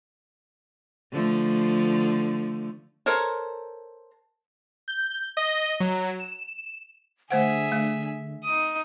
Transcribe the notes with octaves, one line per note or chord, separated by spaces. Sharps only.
D3 F3 A3
A4 A#4 C5 C#5
G6
D#5
F#3
E7
D3 A3 G#4 C5 E5 F#5
A3
D#4 D#6